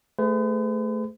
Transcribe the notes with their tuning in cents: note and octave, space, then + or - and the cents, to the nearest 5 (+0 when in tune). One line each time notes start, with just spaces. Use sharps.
A3 +0 G#4 +0 B4 +45